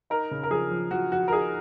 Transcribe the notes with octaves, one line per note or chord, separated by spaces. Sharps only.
D#4 A#4
C#3
A#4
F3 G#4
F3
F3 F#4
F3 F#4
A#4
D#4 G#4